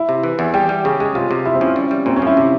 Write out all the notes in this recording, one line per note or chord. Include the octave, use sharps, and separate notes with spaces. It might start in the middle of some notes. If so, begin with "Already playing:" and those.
Already playing: E4
C3
E3
E2
G3 G4
G3
C#3 G#4
G#3 G#4
C3 F4
C3
F3 E4
C4
F3 C#4
G3
G3
A#2 C4
C#4
F3 E4
C3